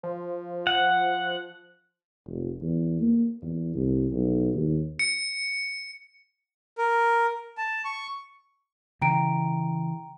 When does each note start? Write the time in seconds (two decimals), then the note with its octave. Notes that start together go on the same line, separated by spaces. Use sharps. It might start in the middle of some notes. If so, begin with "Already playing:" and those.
0.03 F3
0.67 F#5
2.27 F1
2.62 E2
3.00 A#3
3.42 E2
3.75 C2
4.12 B1
4.55 D#2
4.99 C#7
6.78 A#4
7.58 A5
7.85 C#6
9.02 C#3 E3 G5 A#5 D7